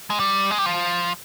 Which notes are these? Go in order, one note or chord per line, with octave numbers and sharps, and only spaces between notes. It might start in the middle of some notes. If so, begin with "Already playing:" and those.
G#3
G3
G#3
G3
F3